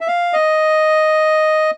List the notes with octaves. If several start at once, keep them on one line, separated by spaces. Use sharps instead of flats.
E5
F5
D#5